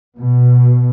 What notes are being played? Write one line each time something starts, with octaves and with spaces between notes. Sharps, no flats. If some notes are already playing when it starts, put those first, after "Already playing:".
B2